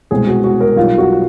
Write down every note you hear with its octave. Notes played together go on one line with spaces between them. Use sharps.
C2 B2 G#3 C4 G#4
F#4
F#4
A#4
B1 B2 G3 F4
F#4